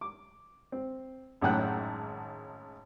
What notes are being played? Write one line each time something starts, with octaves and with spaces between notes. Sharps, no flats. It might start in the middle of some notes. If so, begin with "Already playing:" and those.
D6
C4
G#1 F#2 A2 F#5 G5 F#6